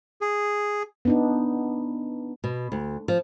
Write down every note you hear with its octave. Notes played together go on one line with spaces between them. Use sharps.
G#4
B3 D4 D#4
B2
D2
F3